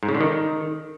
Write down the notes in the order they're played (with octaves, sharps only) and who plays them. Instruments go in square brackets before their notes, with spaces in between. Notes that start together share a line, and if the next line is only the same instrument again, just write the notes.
[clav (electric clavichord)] G#2
C#3
D3
D#3